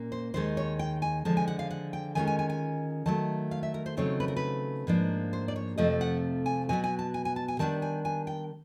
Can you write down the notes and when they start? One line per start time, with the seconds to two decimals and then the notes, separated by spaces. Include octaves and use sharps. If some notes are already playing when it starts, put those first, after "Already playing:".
Already playing: A#2 A#3 C#4
0.12 C5
0.34 D#2 D#3 G#3 C5
0.57 C#5
0.79 G5
1.02 G#5
1.25 D3 F3 G#3 A5
1.37 G#5
1.48 F#5
1.59 F5
1.71 F#5
1.93 G5
2.15 D#3 G#3 C#4 F4 G#5
2.27 G#5
2.39 G#5
2.50 G#5
3.06 D#3 F#3 A3 A5
3.51 F5
3.63 E5
3.74 A#4
3.86 C5
3.97 C#3 F#3 A3 C4 D#4 C#5
4.20 B4
4.28 A#4
4.37 B4
4.87 G#2 F3 A#3 D4
5.33 C5
5.48 D5
5.56 C#5
5.78 F2 C3 F3 A3 D#5
6.01 F#5
6.46 G#5
6.69 B2 F#3 B3 G#5
6.84 G#5
6.99 A5
7.14 G#5
7.25 G#5
7.36 A5
7.48 G#5
7.59 D#3 G3 B3 D4 A5
7.82 G#5
8.05 G#5
8.27 G5